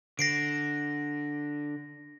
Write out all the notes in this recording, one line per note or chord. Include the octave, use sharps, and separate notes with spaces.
D3 A#6 C7 D7